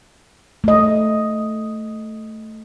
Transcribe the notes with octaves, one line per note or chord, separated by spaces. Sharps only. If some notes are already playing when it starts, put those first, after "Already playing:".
A3 D#5